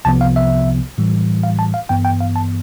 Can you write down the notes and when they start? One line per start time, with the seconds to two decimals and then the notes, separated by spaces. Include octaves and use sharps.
0.05 C2 C3 F3 B3 A5
0.21 F5
0.36 E5
0.98 A2 E3 G3
1.44 F5
1.59 A5
1.74 F5
1.89 G2 E3 B3 G5
2.05 G5
2.21 F5
2.36 A5